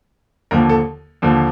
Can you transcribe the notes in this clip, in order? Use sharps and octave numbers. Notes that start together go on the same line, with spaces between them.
D#2 D3 F3 A#3 A#4
A4
D#2 D3 F3 A#3